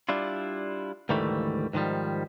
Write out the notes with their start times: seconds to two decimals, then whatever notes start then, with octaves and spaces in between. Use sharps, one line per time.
0.09 G3 D4 E4 F4
1.09 D2 G#2 D#3 E3 G3 A3
1.73 G#2 D#3 F3 G3